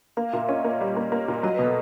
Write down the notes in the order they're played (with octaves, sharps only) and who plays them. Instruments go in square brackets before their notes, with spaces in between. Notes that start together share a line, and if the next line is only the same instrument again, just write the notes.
[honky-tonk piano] A#3 [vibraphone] F5
[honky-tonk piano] A#2 [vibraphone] E5
[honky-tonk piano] C#4 [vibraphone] D#5
[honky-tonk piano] A#3
G3
A#3
A#3
A#2
[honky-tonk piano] F#3 [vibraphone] D#5
[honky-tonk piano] B2 [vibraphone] B4
[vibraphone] A4